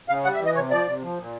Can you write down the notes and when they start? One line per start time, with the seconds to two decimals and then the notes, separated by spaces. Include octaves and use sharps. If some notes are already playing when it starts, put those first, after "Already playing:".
0.09 C#3 F5
0.24 G3 F#5
0.34 E5
0.40 E3
0.46 D#5
0.55 C3 C#5
0.71 F3 D5
0.87 C3
1.02 F3
1.18 A#2